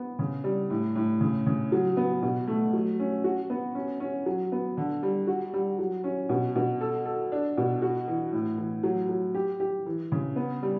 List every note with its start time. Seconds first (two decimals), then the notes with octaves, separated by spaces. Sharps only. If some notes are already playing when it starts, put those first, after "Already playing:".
Already playing: B3
0.19 C#3
0.44 G3
0.70 A2
0.95 A2
1.21 C#3
1.46 C#3
1.72 F#3
1.97 B3
2.22 B2
2.47 A3
2.73 F#3
2.99 C#4
3.24 F#4
3.50 B3
3.75 C#4
4.00 C#4
4.26 F#3
4.52 B3
4.77 D3
5.03 G3
5.27 F#4
5.54 G3
5.78 F#3
6.04 C#4
6.29 B2
6.56 B2
6.81 A4
7.05 A4
7.32 D4
7.57 B2
7.82 F#4
8.08 E3
8.33 A2
8.58 E3
8.83 F#3
9.09 F#3
9.34 G4
9.60 G4
9.86 E3
10.12 C#3
10.36 B3
10.63 G3